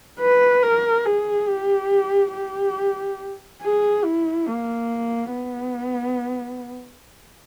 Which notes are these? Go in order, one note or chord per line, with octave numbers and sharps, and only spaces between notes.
B4
A#4
G#4
G4
G4
G#4
E4
A#3
B3